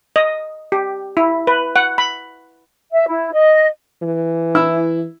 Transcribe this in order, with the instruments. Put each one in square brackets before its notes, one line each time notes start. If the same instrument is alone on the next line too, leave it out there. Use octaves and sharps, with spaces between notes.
[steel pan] D#5
G4
E4
B4
F#5
B5
[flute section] E5
E4
D#5
[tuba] E3
[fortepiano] E4 E6